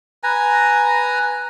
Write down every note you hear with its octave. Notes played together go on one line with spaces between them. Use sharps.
B4 G#5 A#5